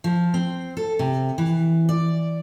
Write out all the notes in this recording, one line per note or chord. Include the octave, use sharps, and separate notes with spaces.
F3
C4
A4
C3
E3
D5